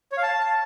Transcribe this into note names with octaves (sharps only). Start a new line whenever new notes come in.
C#5
F5
A5